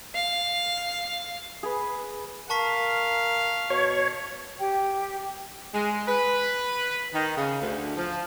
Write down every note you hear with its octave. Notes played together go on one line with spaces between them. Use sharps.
F5
G#4 B4
A#4 F5 A5 C#6 B6
B2 C#5
G4 G5
G#3
B4
D#3
C#3
D2
F3